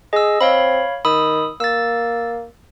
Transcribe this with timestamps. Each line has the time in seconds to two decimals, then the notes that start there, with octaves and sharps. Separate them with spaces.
0.13 G#4 D#5 E6
0.41 C4 C#5 F5 B5
1.05 D#3 B5 D#6 E6
1.60 A#3 E6 A6